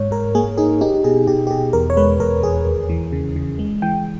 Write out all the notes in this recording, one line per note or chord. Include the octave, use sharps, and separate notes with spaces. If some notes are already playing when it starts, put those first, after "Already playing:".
Already playing: G#2 C#5
G#2 A#4
A#3 G#4
D#4 G#4
D#4 G4
B2 G#4
B2 G4
G4
B2 G#4
E2 A#4
C#5
G#3 B4
E2 A#4
E2 G#4
D#2
E3
C#3
C#3
G#3
E3 G5